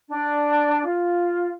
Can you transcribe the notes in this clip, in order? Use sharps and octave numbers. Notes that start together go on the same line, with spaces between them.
D4
F4